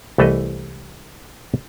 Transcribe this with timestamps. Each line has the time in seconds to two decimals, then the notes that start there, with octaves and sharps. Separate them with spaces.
0.18 C2 E3 A3 A4 B4 D#5